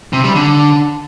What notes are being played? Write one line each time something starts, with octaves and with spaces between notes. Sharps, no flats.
C3
G3
D3